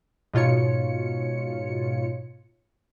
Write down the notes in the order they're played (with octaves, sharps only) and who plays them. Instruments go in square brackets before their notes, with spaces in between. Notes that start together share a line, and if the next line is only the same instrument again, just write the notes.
[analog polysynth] G#2 B2 F4 C#5 C#7